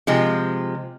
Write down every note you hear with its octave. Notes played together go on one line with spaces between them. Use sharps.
C3 F3 G#3